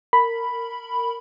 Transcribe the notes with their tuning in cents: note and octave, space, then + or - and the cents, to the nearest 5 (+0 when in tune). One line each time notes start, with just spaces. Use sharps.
A#4 -20 B5 +0